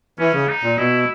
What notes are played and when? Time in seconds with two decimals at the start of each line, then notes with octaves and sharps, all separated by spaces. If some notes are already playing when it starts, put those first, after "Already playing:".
0.19 E3 C#4
0.33 C#3
0.49 D#4
0.63 A#2
0.78 B2 E4